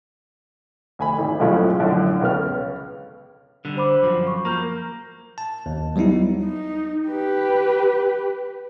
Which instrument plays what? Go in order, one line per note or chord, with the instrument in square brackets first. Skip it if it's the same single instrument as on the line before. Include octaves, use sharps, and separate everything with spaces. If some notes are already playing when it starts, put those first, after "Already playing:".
[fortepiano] D2 G#5 B5
G#1
F#2 A2 C#3 F3 G#3 A3
F#2 A2 D3
C#2 C#3 B3 F6
[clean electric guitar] D3 G3
[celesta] C5 B5 D6
[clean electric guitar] F#2 F3
[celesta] C#6
[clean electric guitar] A#3 [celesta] A#5 F6 G6
[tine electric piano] A5
D#2
F#3 G3 B3 D#4 E4
[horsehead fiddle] D#4
G4 B4